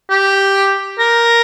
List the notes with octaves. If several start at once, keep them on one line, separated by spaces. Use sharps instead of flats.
G4
A#4